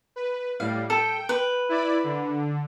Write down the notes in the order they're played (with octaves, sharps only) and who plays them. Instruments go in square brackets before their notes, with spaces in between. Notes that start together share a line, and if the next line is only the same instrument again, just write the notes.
[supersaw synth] B4
[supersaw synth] A2 G3 [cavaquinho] F5
[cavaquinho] A4 [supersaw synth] G5
[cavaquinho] B4
[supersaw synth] E4 D5 B5
D3